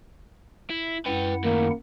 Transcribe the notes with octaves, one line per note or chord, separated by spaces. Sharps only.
E4
F#2 E4 B4 F#5 G5
A2 D#3 A#3